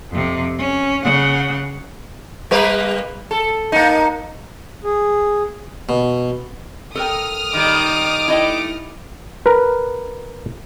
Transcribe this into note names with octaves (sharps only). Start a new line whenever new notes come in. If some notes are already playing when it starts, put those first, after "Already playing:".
F2 C3
C#4
C#3 F#5
G3 A#3 B4
A4
A#3 D#4
G#4
B2
A4 A#4 G5 D#6 F6
D#3 G3 D6
A3 E4 D#5 G5
A#4 B4